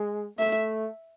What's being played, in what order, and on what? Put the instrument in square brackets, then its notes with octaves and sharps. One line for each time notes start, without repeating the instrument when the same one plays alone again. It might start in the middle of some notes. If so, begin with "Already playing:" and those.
Already playing: [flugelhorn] G#3
[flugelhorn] A3 [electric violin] E5